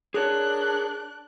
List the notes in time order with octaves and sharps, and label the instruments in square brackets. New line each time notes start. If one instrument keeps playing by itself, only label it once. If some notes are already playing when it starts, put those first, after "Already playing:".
[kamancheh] D4 F#6 [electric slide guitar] G#4 A#4 C#5